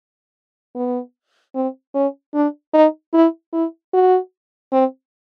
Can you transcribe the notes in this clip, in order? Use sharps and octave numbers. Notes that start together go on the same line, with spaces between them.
B3
C4
C#4
D4
D#4
E4
E4
F#4
C4